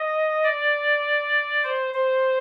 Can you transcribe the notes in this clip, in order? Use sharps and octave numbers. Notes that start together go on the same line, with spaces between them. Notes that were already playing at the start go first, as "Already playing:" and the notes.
Already playing: D#5
D5
C5
C5